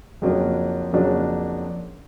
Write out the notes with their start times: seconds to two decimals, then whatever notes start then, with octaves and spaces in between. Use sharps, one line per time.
0.22 F2 C#3 F#3 A#3 D4
0.93 F2 C#3 F#3 A#3 D4